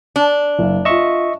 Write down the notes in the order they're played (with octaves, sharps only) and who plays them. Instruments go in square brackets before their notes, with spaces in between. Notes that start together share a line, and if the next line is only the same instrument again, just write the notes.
[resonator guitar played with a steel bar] D4
[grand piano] F#1 F5
[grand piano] F4 E7 [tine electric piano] D#5 E5 C#6